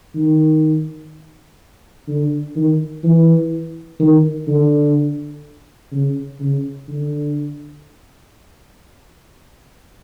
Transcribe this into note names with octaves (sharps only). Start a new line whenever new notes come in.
D#3
D3
D#3
E3
D#3
D3
C#3
C#3
D3